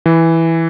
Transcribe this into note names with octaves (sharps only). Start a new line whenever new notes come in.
E3